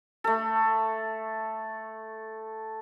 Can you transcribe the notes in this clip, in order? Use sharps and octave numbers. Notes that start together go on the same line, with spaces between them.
A3 A4